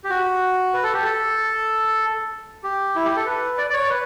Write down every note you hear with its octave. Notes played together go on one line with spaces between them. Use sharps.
G4
F#4
B4
A4
G4
A4
G4
E4
G4
A4
B4
D5
D5
C#5
B4